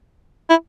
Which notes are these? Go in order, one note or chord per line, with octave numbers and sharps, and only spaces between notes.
E4